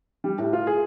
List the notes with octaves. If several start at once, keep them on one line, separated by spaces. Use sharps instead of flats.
G3
A2
F4
G#4